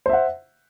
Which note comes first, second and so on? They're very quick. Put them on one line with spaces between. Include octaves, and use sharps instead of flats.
C5 E5 F#5